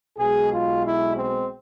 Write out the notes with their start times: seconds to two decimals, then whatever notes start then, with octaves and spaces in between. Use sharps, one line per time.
0.18 B1 B2 G#3 G#4
0.51 F4
0.84 E4
1.16 C4